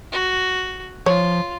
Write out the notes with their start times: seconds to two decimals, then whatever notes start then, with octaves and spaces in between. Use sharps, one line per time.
0.12 F#4
1.06 F3 F4 C#5